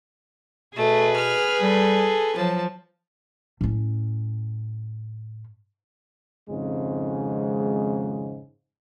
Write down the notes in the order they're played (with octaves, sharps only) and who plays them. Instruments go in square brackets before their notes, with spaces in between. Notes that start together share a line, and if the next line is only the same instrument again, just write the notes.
[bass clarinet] B2 [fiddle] A3 [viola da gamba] G#4 B4
[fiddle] F6
[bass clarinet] G3 [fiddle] A4
[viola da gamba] F3 [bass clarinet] F#3 [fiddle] A5
[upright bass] A2 C#4
[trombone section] G#1 F2 G#2 C#3 G#3